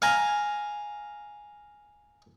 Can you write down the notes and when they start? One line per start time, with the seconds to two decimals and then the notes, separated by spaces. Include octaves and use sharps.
0.02 F5 G#5 A#5